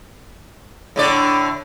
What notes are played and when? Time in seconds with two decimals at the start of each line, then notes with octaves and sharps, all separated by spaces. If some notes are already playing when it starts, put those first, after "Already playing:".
0.96 A2 D3 D5